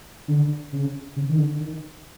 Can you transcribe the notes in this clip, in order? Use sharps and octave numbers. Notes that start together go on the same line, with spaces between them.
D3
C#3
C#3
D#3
D3
D#3